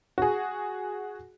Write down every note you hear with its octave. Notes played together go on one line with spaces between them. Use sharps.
F#4 G#4